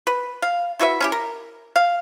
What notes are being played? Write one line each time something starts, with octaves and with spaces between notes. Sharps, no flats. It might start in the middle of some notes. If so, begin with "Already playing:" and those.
B4
F5
E4 F#4 B4 E5
C#4 E4 G4
A#4
F5